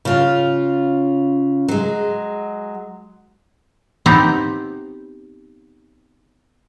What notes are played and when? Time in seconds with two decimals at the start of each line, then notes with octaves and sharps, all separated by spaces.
0.05 C#3 F4
1.68 F#3 G#3
4.06 B3 C4 D#4 G4 C5